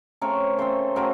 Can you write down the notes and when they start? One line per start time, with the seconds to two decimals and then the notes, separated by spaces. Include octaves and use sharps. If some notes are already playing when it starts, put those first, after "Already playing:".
0.21 C#3 A3 C4 A#4 C#5
0.58 C#3 A3 C4 A4 C5
0.96 C#3 A3 C4 F#4 A#4